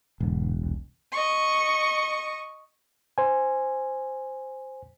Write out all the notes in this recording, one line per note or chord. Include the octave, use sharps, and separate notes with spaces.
E1 G#2 B2 D3
C2
D#5 C#6
C5 G#5